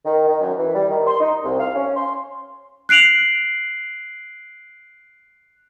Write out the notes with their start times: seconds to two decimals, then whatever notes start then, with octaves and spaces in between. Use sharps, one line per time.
0.05 D#3
0.27 D#3
0.41 F#2
0.58 E3
0.74 G3
0.89 D#3
1.07 C6
1.20 D#4
1.43 C2
1.59 F5
1.75 C#4
1.96 C6
2.89 F#6 C7 D7 F7 F#7